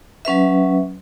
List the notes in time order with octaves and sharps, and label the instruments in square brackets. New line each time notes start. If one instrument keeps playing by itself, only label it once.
[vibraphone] F#3 C#4 B4 E5